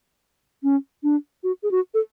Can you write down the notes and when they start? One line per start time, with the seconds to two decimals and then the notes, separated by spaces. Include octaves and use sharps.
0.63 C#4
1.03 D4
1.43 F#4
1.63 G#4
1.71 F#4
1.94 A4